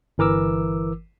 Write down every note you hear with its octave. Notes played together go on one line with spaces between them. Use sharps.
G1 E3 A#4 D6 E6